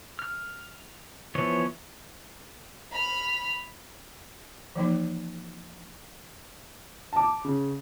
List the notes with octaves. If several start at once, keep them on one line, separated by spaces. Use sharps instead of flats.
F6
E3 F3 B3 C#5
B5 F6
E3 F3 A#3 D#4
A5 D6
C#3